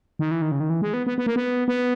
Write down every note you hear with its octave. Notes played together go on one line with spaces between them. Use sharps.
D#3
E3
D#3
C#3
D#3
E3
G#3
B3
B3
B3
A#3
B3
B3